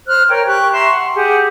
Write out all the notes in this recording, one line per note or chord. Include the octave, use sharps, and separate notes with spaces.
C5 F6 F#6
A#4 C#5 G5
G4 C#6 F#6
E5 A#5 C6 C#6
F#5
G4 G#4 F#5